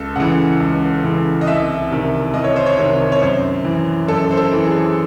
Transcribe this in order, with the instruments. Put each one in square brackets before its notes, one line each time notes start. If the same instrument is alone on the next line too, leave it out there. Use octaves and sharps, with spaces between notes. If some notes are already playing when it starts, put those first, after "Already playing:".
Already playing: [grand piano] C#2 A4
C#3 E3 F#5
C#2
C#3 E3
D#5
C2 E5
C3 D#3
C2 D#5
C#5
C5
C#5
C3 D#3
C#5
F#2 C5
E3
F#2 A4
C5
A4
E3
G#4